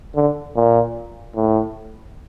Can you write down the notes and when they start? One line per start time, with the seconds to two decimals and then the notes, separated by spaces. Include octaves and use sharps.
0.15 D3
0.56 A#2
1.36 A2